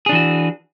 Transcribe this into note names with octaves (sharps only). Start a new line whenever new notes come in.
E3 D4 F#4 G#4